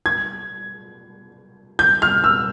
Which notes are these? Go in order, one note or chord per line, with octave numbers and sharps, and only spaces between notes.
G#6
G6
F6
E6